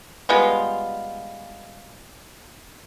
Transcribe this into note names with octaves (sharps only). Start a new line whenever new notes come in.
G3 G#3 B3 F4